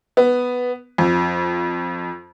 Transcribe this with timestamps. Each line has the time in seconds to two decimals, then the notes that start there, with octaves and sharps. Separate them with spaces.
0.17 B3
0.98 F2